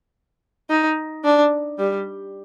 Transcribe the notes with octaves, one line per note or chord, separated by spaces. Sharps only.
D#4
D4
G3